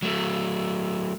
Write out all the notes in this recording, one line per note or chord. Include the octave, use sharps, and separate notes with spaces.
F#3 A3